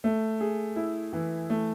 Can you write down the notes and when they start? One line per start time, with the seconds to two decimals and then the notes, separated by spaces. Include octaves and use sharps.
0.04 A3
0.40 G#4
0.76 E4
1.13 E3
1.50 A3